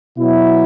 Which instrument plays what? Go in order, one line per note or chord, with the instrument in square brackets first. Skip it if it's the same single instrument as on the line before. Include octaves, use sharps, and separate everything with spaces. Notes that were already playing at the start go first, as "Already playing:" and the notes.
[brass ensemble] B2 F#3 E4